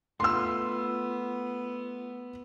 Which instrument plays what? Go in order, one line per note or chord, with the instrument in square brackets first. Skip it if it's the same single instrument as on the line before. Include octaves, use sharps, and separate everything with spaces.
[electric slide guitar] A3 F4 [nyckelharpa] B3 [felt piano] C6 E6